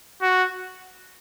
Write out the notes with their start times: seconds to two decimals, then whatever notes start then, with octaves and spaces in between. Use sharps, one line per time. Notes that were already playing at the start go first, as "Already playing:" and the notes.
0.22 F#4